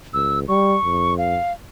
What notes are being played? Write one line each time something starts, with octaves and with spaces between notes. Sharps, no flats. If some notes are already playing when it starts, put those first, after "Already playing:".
C#2 E6
G3 C#6
F2
F5